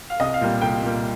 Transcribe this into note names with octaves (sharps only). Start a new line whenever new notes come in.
F5
C2 D#5
F5
A#2 G3 A#3
C2 G5
A#2 G3 A#3